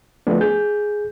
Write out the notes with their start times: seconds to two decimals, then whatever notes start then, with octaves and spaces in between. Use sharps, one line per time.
0.27 F3 A3 B3 D4
0.41 G#4 G6